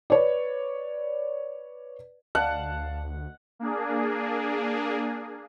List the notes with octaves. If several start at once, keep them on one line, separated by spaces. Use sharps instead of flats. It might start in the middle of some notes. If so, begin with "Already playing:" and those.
B4 C#5 D5
D2 D5 F5 F#5 A5
A#3 D4 G#4